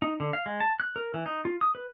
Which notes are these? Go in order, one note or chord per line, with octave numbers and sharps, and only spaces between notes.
D#4
D3
F5
G#3
A5
F#6
A#4
E3
D#4
F4
D#6
B4